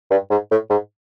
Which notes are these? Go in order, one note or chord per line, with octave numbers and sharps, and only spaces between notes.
G2
G#2
A2
G#2